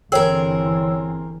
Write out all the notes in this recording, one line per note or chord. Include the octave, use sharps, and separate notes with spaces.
G1 E3 C4 G#4 A#4 C#5 G5 E6